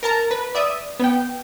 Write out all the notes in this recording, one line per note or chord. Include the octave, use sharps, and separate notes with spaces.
A#4 A5 A#5
B4
D5 E5 D#6
B3 G5